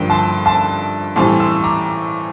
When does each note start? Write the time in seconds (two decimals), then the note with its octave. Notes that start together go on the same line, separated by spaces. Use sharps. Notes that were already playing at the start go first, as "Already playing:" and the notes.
Already playing: G2 D3 F3 A#3 G5
0.10 A5 C6
0.45 A5 C6
1.16 A2 E3 G3 C4 A5 C6
1.40 C6 E6
1.63 A#5 D6